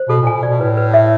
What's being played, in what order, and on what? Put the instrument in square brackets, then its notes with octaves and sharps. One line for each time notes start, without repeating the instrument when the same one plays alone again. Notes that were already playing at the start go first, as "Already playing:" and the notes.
Already playing: [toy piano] C5
[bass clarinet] B2 [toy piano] A4
[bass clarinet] A#2
[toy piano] G#5
[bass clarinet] B2
[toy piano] D5
[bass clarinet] B2
[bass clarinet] A2 [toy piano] B4
[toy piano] B4
E5